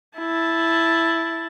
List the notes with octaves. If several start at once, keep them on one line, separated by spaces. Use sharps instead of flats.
E4 A5